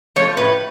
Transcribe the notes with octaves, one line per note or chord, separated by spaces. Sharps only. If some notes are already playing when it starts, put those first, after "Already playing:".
F3 A3 C#5
A2 B4